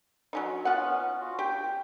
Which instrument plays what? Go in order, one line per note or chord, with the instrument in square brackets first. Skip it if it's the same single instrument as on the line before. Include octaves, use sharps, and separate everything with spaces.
[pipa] F#3 C#4 D#4
[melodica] B3 C#4 [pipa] F4 F#5
[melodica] F4 F#4
[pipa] G4 [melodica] G5